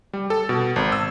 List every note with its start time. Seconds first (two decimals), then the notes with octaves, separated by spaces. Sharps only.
0.13 G3
0.30 A4
0.49 B2
0.76 G#1
0.92 E6